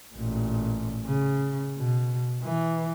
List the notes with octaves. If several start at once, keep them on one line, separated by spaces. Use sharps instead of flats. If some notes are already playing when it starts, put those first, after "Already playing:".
A1 A#2
C#3
B2
E3